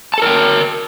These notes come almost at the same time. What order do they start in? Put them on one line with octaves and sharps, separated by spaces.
A5 A4 A#4 G5